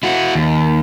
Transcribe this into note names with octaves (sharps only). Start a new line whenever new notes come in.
E4 F#4
D#2